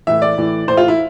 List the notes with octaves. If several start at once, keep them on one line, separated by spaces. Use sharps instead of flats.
A2 E3 E5
D5
A2 E3
A2 E3 C5
F4
E4